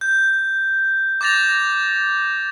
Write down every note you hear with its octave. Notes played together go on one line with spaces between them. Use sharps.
G6
D6 G6 A6 A#6 F7